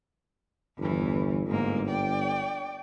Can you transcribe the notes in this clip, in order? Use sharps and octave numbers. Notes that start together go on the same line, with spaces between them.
G1 E2 E3
G1 G#2 A#3
D5 G5